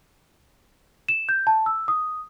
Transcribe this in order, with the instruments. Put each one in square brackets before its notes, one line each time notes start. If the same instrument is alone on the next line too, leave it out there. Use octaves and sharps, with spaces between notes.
[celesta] E7
G6
A5
E6
D#6